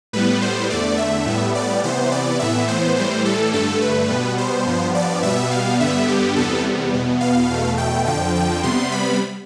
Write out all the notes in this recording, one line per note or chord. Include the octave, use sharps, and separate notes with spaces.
A2 G3 B3 B4
C5
E2 D3 A3 D5
E5
A2 G3 B3
D5
C3 E3 B3 C5
D5
A2 E3 B3 E5
C5
A2 E3 G3 C5
A4
G2 D3 A3 A4
B4
B2 G3 B3
C5
G2 F3 B3
D5
B2 G3 B3 E5
F5
G2 D3 G3 B3 E5
G4
E2 C3 G3 B3 A4
E2 B2 B3
F5
E2 B2 A3
G5
F2 D3 F3 G5
G5
C3 G3 B3 C6
B5